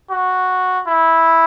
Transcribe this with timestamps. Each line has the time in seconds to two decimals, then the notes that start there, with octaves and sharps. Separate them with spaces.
0.10 F#4
0.87 E4